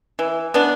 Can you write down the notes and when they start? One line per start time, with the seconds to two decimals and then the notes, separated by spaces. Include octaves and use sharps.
0.19 E3
0.54 B3 D4